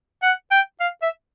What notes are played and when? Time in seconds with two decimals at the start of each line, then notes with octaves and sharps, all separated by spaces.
0.23 F#5
0.51 G5
0.80 F5
1.02 E5